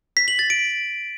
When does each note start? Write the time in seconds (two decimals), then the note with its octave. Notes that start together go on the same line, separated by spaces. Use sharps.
0.17 B6
0.28 F#7
0.39 A6
0.50 D7